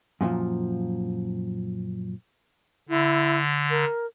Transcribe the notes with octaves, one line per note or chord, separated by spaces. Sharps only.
F#2 A#2 D3 F3
D3 E4
A#4